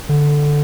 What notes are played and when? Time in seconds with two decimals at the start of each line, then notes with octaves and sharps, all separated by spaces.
0.09 D3